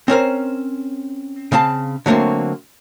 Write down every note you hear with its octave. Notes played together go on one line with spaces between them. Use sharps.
C4 C#4 A#4 C5
C#3 C4 F5 A5
D3 F#3 A3 A#3 C4